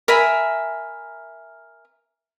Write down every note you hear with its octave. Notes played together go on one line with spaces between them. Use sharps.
A#4 E5 G#5 B5